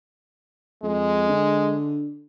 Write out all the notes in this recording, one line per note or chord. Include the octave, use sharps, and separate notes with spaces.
F2 G#3
D3